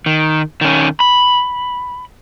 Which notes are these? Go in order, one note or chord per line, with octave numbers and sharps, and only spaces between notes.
D#3
D#3 C#4
B5